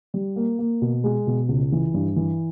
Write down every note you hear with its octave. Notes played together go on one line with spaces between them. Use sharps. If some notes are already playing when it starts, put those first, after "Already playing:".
G3
A#3
A#3
B2
G#3
B2
C#2
E3
G2
E3